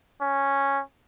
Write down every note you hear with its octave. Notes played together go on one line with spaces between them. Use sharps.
C#4